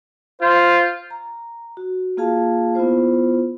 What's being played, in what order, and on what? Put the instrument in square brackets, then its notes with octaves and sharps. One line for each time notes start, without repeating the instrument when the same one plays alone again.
[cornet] F4 [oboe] C5
[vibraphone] A#5
F#4
A#3 F4 G#4 F5 A5
B3 E4 F4 C5